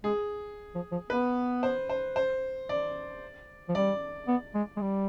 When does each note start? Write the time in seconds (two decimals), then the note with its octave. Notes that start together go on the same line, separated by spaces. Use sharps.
0.04 G#3 G#4
0.75 F3
0.92 F3
1.10 B3 B4
1.63 C5
1.89 C5
2.16 C5
2.69 D5
3.69 F3
3.75 G3 D5
4.28 B3
4.55 G#3
4.77 G#3
4.81 G3